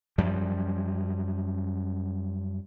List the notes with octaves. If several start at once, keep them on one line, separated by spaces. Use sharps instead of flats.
F#2 F3 G3